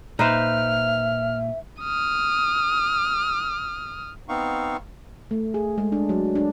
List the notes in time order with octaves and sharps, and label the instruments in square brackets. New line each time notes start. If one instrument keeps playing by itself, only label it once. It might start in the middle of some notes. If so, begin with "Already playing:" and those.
[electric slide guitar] A#2 [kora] D#4 B4 C5 [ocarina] E5 [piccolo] F6
[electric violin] D#6 F6
[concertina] B3 C4 D#4 F5 C#6
[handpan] A3
G#4
G#3
D4
F#3
D4